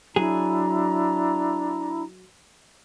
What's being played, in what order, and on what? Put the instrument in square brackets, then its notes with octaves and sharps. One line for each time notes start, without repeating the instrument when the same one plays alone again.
[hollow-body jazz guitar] F#3 G#4 [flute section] D4 E4 A#5